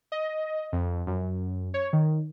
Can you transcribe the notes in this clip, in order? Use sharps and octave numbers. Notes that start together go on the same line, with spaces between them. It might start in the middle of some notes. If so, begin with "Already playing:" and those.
D#5
F2
F#2
C#5
D#3